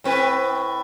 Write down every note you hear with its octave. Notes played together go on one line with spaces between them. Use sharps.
A2 C4 B4